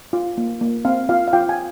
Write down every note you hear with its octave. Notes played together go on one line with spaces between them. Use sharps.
F4
A#3
A#3
C4 F5
F4 F5
F5
F4 G5
G#5